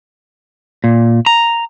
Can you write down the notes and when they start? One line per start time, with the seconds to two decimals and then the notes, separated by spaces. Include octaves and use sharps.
0.84 A#2
1.26 A#5